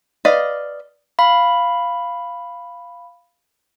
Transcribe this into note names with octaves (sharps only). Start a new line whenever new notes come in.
B4 D5 D#5 F5
F5 B5